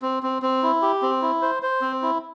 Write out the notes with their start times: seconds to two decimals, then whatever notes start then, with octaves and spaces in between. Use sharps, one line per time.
0.02 C4
0.23 C4
0.42 C4
0.63 E4
0.82 G4
1.02 C4
1.22 E4
1.42 C5
1.63 C5
1.81 C4
2.02 E4